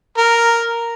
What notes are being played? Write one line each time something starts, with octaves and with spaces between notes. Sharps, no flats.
A#4